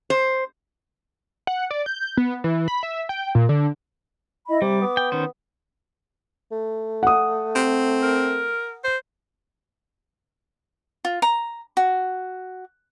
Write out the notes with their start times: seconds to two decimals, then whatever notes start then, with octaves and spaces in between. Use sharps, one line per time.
0.10 C5
1.47 F#5
1.71 D5
1.86 G6
2.17 B3
2.44 E3
2.68 B5
2.83 E5
3.09 G5
3.35 A#2
3.49 D3
4.48 E4 D#5 B5
4.62 C3 G3 D6
4.81 B3
4.97 G5
5.12 D#3 C#4 C5
6.52 A3
7.03 F#5 D#6
7.55 C4
8.02 A#4
8.84 C5
11.05 F4
11.22 A#5
11.77 F#4